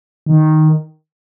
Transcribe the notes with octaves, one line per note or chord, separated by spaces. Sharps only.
D#3